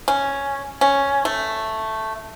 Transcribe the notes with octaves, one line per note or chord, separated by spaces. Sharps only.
C#4
C#4
A3